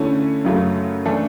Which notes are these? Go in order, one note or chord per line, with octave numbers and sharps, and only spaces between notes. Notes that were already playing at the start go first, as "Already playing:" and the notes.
Already playing: D3 A3 C#4 E4
F#2 C#3 F#3 A3
E3 A3 D4 A4